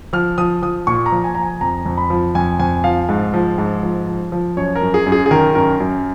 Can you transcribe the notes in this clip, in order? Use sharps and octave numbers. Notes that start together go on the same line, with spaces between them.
F3 F6
F3 D#6
F3 D#6
A#2 C#6
A#5
F3
G#5
F3 A#5
G#5
F2 A#5
F2
B5
F3
F2 G#5
F2 G#5
F3 F5
G#2
F3
G#2
F3
F3
F3
F#2 C#5
A#4
F#2
G#4
F#2
G#4
G#4
D#3 A#4
F#2 A#4
F#2